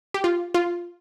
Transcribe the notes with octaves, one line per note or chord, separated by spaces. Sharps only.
G4
F4
F4